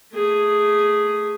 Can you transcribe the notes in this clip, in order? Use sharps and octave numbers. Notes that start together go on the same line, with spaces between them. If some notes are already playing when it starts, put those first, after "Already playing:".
A3 G#4